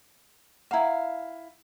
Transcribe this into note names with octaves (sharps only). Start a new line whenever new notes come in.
E4 F5 F#5 A#5